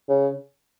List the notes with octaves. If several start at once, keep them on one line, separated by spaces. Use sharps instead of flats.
C#3